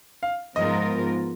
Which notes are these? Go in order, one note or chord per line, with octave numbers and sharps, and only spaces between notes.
F5
G#2 F3 B3 F4 A#4 D#5